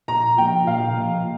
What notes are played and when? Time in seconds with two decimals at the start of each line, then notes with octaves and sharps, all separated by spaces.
0.08 A#2 A#5
0.37 F3 A#3 F4 G5
0.67 A#2 F5
0.97 F3 A#3 F4